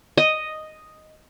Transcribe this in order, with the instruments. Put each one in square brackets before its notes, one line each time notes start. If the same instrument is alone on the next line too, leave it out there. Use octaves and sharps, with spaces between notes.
[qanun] D#5